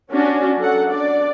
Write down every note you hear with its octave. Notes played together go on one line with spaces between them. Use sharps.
C#4 D4 F#4
F#3 A4 F#5
D4 D5